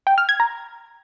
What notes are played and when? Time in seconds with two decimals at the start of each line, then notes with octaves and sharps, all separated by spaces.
0.07 G5
0.18 F6
0.29 G#6
0.40 A#5